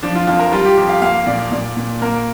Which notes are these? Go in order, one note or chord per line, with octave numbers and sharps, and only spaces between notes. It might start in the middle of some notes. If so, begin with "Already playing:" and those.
F3 D4
F4
F2 F4
A#4
G3 F4
G4
F2 G4
F5
A#3 F5
A#2 D5
A#2 D5
A#2
A#3 A#4